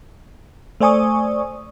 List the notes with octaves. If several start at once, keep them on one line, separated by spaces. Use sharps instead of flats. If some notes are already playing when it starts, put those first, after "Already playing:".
A3 C5 D5 G#5 C#6 D#6